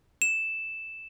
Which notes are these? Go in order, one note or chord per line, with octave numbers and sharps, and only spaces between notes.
E7